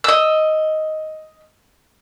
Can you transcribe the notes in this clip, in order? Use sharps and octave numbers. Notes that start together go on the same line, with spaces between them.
D#5 E6